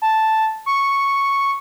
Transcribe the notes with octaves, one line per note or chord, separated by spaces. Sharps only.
A5
C#6